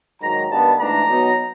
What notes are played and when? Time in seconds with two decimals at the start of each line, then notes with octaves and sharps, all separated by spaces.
0.21 G#2 D#3 F#3 A#5
0.50 G2 D#3 G3 B3 A5
0.79 G#2 E3 A3 D4 A#5
1.08 B2 F#3 B3 D#4